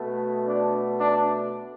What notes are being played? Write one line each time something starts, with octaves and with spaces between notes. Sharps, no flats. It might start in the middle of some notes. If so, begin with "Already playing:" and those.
Already playing: B2 A3
D4
D4